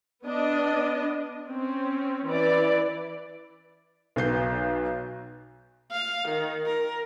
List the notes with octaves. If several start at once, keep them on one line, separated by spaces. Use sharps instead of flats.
B3 D4 D#5
C4 C#4
E3 D5
B1 B2 G6 C7
F5
D#3
A#4